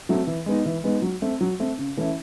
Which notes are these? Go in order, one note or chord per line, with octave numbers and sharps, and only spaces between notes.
F#3 A3 C4
E3
G#3 B3 D#4
E3
G#3 B3 D#4
F#3
A3 C4
F#3
A3 C4
C#3
E3 A3 C#4 E4